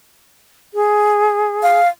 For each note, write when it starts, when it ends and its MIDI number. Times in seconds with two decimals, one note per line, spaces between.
0.74 1.80 68
1.63 1.88 77